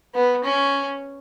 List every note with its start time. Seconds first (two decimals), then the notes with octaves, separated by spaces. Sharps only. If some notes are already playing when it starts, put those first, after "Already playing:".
0.15 B3
0.44 C#4